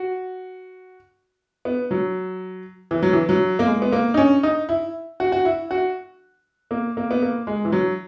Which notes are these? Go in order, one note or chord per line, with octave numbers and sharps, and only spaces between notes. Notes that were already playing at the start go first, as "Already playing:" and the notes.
Already playing: F#4
B3
F#3
E3
F#3
E3
F#3
A#3
G#3
B3
A#3
D#4
C#4
D#4
E4
F#4
F#4
E4
F#4
A#3
A#3
B3
A#3
G#3
E3
F#3